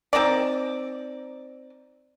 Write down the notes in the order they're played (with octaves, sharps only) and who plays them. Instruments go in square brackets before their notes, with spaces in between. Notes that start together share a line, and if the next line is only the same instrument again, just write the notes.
[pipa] C4 D#4 A#4 D5